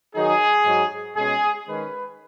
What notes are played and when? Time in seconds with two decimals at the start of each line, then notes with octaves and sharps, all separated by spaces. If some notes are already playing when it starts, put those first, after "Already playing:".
0.14 D#3 F#3 D#4 G#4
0.65 G#2 F#3 D#4
1.15 B2 G#3 C#4 G#4
1.66 D#3 G#3 C#4 B4